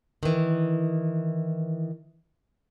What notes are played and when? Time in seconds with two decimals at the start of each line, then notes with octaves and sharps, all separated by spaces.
0.23 D#3 E3